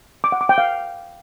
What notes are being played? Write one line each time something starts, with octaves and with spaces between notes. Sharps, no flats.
D6
F#5
D6
G5
F5